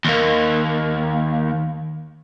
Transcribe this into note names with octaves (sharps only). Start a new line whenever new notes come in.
D#2 A#3